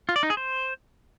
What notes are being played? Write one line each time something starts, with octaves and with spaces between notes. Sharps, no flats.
F4
D5
D#4
G#4
C5